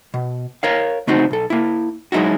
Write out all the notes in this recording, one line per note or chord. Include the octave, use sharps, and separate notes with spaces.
B2
A#4 C#5 F5
C#3 A3 C4 D#4 F#4
B1 A4
A#3 E4
F#3 G#3 D#4 E4 F#4